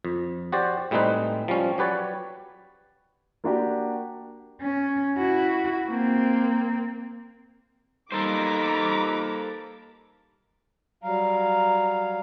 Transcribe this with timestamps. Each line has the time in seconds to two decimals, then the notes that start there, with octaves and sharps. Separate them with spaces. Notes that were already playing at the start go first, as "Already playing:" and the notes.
0.05 F2
0.52 F#4 G4 C5 D5
0.91 A2 G3 G#3 C4 D#4 B4
1.48 F3 G3 C#4
1.78 F#3 G4 B4 C#5 D5
3.44 A#3 D4 F#4 G4
4.61 C#4
5.18 E4 F#4
5.87 A#3 C4
8.12 G3 A#3 D#4 A4 C5 A#5 B5 D6
11.03 F#3 G3 F5 A#5